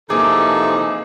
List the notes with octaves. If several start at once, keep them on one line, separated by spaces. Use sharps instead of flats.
C3 E3 F3 A#3 D#4 G#4 A4 D6